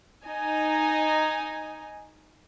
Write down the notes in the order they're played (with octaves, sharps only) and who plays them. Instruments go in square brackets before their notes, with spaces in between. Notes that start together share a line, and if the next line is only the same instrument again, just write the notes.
[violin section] D#4 G#5